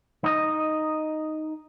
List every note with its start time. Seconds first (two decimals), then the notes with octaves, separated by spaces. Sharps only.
0.24 D#4 D#5